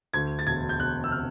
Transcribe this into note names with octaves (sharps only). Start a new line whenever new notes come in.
D2 G#6
A6
E1 G#6
G6
E1 F#6
E6
C3 F6